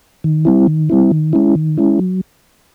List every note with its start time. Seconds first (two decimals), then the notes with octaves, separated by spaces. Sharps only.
0.24 D#3
0.45 G3 C4 E4
0.67 D#3
0.90 G3 C4 E4
1.11 D#3
1.33 G#3 C#4 E4
1.55 D#3
1.78 G#3 C#4 E4
1.99 F#3